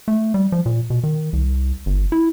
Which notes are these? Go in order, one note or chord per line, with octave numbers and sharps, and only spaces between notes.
A3
G3
F3
A#2
B2
D#3
C2
G1
E4